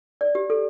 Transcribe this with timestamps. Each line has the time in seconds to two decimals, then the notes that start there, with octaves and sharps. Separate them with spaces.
0.21 D5
0.35 G4
0.50 A4